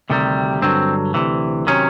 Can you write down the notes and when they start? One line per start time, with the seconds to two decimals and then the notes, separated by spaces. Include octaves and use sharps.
0.10 D2 C3 D#3 G3
0.62 G2 D3 F#3 C4
1.14 D2 C3 E3
1.67 C3 D#3 F#3 C#4